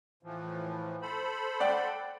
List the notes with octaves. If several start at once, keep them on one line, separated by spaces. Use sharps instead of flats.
A2 E3 F3
A4 C5 B5
D5 F#5 G5